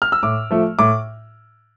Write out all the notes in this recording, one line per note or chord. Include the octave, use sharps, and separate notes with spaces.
F6
E6
A2 D6
F3 A3
A2 D6